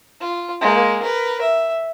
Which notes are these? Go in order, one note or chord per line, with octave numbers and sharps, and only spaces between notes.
F4
G#3 A#3
A#4 B4
E5